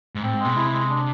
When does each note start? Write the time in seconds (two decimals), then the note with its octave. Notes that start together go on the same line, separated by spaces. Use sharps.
0.15 G#2
0.23 A2 C4
0.34 G#2
0.40 G#3
0.45 B2
0.56 C3 E4
0.73 G#3
0.89 D4